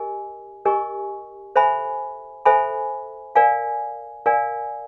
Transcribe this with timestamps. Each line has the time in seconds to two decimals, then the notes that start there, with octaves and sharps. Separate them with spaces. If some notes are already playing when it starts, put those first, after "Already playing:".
Already playing: G4 A#4 D#5 G#5
0.65 G4 A#4 D#5 G#5 C#6
1.56 A4 C5 E5 G#5 B5
2.45 A4 C5 E5 G#5 B5
3.35 A#4 D5 F5 G#5
4.26 A#4 D5 F5 G#5